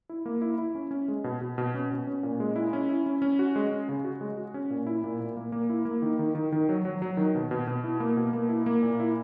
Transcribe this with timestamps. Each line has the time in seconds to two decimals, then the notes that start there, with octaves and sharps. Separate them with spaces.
0.09 E4
0.26 A#3
0.42 E4
0.58 E4
0.75 C#4
0.91 C#4
1.08 G#3
1.24 B2
1.41 B2
1.58 B2
1.74 C#4
1.91 B2
2.07 C#4
2.23 A#2
2.40 G#3
2.56 E4
2.73 C#4
2.89 E4
3.06 C#4
3.22 C#4
3.39 F#4
3.56 G#3
3.72 C#4
3.89 C#3
4.04 F#4
4.21 G#3
4.37 F#4
4.54 C#4
4.70 A#2
4.87 E4
5.04 A#2
5.20 A#2
5.37 A#3
5.52 A#3
5.70 E4
5.85 A#3
6.02 D#3
6.19 D#3
6.35 D#3
6.52 D#3
6.69 F#3
6.85 F#3
7.02 F#3
7.17 D#3
7.35 B2
7.51 B2
7.67 B2
7.84 E4
8.00 A#3
8.17 B2
8.33 A#3
8.49 E4
8.66 A#3
8.83 A#2
9.00 E4